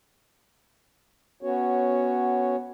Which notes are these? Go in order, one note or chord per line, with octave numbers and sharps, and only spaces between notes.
B3 C#4 F#4 C#5